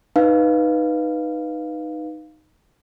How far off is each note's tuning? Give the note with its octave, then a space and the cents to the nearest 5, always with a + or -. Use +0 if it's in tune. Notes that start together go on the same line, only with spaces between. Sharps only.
D#4 -5 B4 +0 F5 +0